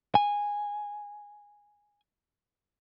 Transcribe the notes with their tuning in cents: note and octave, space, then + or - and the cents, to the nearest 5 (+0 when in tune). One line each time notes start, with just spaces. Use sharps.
G#5 -10